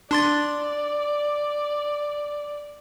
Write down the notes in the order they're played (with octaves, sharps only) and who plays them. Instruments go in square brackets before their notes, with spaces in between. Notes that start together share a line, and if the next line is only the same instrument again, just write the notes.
[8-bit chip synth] D4 C6 A6 [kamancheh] D5